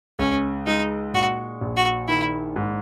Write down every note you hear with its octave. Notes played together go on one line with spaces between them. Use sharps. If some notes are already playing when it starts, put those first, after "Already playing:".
C#2 C#4
G#3 D#4
A#2 F#4
A#1
F#4
D#3 E4
G#2